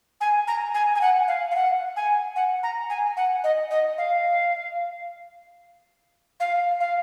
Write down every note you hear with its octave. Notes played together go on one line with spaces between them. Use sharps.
G#5
A#5
G#5
G#5
F#5
F5
F5
F#5
G#5
F#5
A#5
G#5
F#5
D#5
D#5
F5
F5
F5